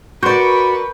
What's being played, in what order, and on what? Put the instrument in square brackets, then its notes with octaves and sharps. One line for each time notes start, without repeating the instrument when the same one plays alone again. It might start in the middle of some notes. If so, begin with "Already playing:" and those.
[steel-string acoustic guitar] F#4 D5 [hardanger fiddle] A#4 B4 [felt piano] C6 C#6 G6